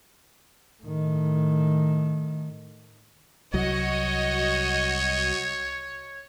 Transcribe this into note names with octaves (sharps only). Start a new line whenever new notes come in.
A2 D#3
C2 F#3 F#4 C#5 D#5